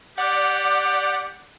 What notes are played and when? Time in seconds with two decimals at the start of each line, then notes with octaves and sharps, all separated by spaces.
0.18 G4 D5 F#5 D6